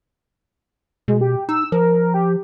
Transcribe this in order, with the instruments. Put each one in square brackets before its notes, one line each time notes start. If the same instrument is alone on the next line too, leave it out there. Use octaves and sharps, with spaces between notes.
[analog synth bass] B2 [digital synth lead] G#3
[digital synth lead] G4
[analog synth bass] D#4 [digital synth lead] E6
[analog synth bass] F3 [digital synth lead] A#4
[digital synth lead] G4